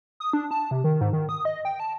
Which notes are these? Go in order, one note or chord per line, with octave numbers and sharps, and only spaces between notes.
D#6
D4
A5
C3
D#3
G#2
D#3
D#6
D#5
G5
A5